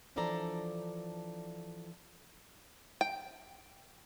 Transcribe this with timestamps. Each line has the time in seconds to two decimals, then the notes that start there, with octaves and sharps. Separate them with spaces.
0.16 E3 F3 D4 A4 D5 A#5
3.01 G5